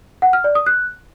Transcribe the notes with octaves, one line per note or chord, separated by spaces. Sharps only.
F#5
F6
D5
D#6
F#6